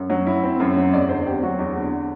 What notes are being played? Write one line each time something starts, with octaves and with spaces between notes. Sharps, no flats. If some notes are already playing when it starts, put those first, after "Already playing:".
Already playing: F#2
F#3
E4
C4
F#2
F#3
E2 D5
D3 C5
C4 G4
F#3 F#4
E2
D3